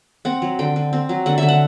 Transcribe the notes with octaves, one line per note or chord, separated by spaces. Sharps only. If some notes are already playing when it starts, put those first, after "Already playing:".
C4 F#5
F#3
D3 G5
D3
C4
F#3
D3 F#5
D3 E5
F#5